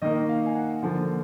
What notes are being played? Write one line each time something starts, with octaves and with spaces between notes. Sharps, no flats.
D#3 A#3 D#5
F5
G#5
F#5
D3 F3 A#3